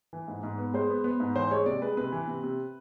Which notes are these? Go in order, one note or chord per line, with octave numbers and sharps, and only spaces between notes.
E3
G#2
G#2
B3
G#3 C5
B3
B3
G#2
E3 C5
G#3 C#5
C3 D5
G#3 B4
C3 B4
E3
C3
C3